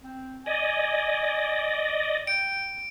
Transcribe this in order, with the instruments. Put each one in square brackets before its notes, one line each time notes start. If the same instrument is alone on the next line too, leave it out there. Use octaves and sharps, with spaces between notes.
[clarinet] C4
[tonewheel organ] D5 D#5 [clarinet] G#5
[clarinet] G5 [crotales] D7